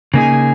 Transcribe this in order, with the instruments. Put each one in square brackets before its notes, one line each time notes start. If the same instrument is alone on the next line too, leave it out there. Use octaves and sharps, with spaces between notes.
[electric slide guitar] C#3 A#3 D#4 G#4 [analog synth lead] G#5